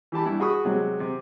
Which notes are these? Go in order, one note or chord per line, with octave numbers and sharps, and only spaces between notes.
E3 G4 A5 B5
G2 E4
F#4 G#4 B5 C#6 D#6
C3 F#3 G#3
C3